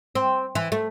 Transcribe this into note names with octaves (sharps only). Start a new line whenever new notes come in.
C4
E3
A3